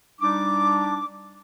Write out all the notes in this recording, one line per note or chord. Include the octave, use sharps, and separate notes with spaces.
G3 D4 D#4 D6